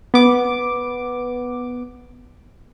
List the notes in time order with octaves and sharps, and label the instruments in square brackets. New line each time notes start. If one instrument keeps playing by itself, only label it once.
[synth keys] B3 D6